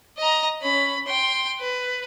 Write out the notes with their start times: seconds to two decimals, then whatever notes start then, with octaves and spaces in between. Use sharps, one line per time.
0.18 D#5 A#5
0.62 C#4 B5
1.07 G5 C6
1.60 B4